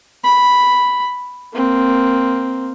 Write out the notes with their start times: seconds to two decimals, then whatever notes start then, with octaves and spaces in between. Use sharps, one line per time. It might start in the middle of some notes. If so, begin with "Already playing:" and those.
0.24 B5
1.53 A#3 C4